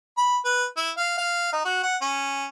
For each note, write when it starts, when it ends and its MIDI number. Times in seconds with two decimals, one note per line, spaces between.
0.17 0.38 83
0.45 0.65 71
0.77 0.90 64
0.97 1.17 77
1.18 1.52 77
1.53 1.63 63
1.65 1.78 66
1.83 1.96 78
2.01 2.44 61